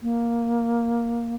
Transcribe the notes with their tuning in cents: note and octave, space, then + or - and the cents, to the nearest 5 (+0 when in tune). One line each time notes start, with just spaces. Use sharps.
A#3 +5